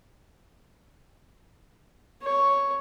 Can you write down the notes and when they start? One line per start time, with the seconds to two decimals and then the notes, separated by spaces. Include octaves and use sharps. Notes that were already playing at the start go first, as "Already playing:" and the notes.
2.23 C#5